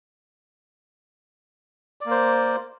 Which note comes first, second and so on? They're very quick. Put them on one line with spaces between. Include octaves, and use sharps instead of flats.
D5 A#3 C5